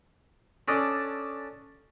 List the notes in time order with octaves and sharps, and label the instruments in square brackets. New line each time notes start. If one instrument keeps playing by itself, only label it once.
[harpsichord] C#4 D4 A4 D5 D#5